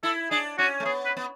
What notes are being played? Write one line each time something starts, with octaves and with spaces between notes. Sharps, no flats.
E4 A4
D4 G#4
C#4 F#4
A3
B3 G#4
B4
B3